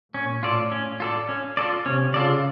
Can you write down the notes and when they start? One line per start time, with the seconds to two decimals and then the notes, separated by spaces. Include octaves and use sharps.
0.14 A#2 C#4
0.43 A2 F4 A4 D5
0.72 C#4
1.00 F4 A4 D5
1.29 C#4
1.57 F4 A4 D5
1.86 C3 C#4
2.14 C#3 F4 A4 D5